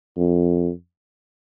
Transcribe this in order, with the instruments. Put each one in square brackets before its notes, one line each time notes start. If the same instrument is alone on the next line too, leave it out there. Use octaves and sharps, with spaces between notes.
[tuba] F2